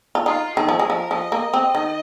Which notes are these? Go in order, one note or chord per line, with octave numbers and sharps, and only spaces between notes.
F4
D#4 F4
D#3 G#4
F3
G#3 A#4
F3
F3 D#5
A#3
C4
D#3